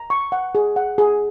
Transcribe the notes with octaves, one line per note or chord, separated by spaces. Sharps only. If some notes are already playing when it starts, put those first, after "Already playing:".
Already playing: A#5
C#6
F#5
G#4
F#5
G#4